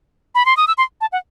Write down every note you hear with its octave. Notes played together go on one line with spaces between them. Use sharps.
B5
C6
D#6
E6
C6
A5
F#5